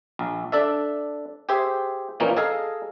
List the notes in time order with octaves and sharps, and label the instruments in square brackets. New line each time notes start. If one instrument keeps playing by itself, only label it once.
[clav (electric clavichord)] A#1
D4 A4 D5 E5
G4 G#4 C5 E5
A#2 E3 F3 A#3 C#4 D#4
G#4 A4 D#5 F5 A#5